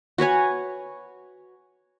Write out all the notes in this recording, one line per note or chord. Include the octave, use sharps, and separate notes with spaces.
F#4 B4 C#5 G#5